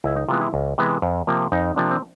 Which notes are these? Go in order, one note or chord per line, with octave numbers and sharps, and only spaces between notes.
C#2 E4
D#4
C3 E3 G#3 B3 F4
E4
C#2
C3 E3 G#3 B3
F2
C3 F3 A#3
F2 D#4
C3 F3 A#3 D4
C4